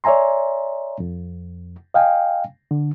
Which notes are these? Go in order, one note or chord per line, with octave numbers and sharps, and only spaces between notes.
C#5 D5 E5 G#5 A#5 C6
F2
D#5 F5 G5 G#5
D3